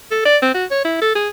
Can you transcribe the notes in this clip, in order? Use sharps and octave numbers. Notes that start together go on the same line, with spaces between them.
A4
D5
C4
F#4
C#5
E4
A4
G#4